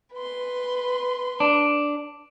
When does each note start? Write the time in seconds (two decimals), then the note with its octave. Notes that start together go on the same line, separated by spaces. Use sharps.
0.14 B4 C6
1.40 D4